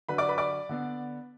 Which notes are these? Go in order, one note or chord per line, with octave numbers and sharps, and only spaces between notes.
D3 F#3 D4 B4 B5
D5 D6
B4 B5
D5 D6
D3 B3 D4